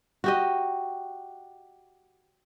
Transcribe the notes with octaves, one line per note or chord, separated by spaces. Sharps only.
F#4 G4 D#5